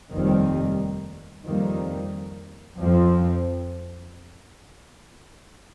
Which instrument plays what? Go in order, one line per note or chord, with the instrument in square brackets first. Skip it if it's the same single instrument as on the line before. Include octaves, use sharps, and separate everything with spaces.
[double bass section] F1 D#2 D#3 G3 C4
F2 D#3 G3 A#3
F2 F3 C4